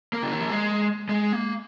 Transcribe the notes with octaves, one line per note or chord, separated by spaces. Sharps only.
A#3
C#3
D#3
F3
G#3
G#3
A#3